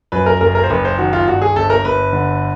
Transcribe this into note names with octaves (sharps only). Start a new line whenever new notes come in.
F#2 B4
A#4
F#1 A#4
A#4
C5
F#1 B4
C5
D#3 F#4
F4
G2 F#4
G#4
G1 A4
A#4
G1 B4
D3